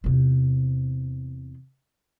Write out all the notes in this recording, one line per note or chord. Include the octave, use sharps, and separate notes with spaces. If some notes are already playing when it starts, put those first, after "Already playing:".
E2 C3